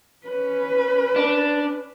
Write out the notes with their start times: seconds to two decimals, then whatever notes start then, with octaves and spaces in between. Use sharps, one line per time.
0.25 C#4 B4
1.16 D4